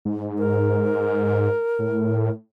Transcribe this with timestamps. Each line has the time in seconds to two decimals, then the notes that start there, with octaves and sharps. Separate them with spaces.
0.05 G#2
0.38 A#4
1.79 A2